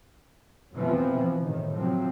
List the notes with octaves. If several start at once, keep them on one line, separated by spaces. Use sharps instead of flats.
F1 B2 E3 F3 B3 C4
A2 C3 D#3
C3 F3 F#3 C4